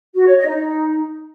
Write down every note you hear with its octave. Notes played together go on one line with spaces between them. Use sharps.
F#4
C#5
D#5
D#4